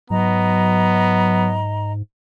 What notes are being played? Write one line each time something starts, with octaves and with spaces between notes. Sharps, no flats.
G#2 F#3 B3 D#5 A#5